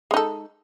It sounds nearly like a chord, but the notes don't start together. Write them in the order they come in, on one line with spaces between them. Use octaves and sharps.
G#3 D#4 A4